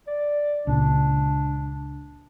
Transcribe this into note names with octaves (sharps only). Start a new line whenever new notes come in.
D5
C#2 A#2 D4